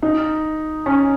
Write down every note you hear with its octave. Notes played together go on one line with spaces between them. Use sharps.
D#4
C#4